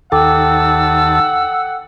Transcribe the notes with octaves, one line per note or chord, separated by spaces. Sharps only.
D#2 A4 F#5 G5 A5 D6 E6